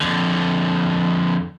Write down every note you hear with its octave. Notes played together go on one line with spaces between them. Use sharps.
F2 D3